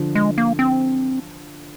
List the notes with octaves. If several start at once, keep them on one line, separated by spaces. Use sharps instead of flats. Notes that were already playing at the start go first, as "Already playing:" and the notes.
Already playing: D3 F3
G#3
A#3
C4